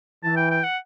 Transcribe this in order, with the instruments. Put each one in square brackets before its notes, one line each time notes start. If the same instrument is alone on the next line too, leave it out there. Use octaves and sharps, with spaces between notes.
[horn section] E3 [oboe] A5
[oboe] G5
G5
F#5